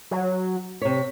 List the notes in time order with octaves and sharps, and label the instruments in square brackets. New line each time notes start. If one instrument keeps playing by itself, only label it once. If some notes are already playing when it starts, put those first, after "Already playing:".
[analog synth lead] F#3
[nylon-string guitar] C3 C#5 [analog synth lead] B6